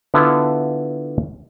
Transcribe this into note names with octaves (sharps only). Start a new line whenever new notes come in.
D3 B3 E4 F4 B4 E5